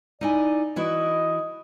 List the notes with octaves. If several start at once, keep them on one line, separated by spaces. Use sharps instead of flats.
D#4 E4 D5 G#5
E3 E4 F#4 D#5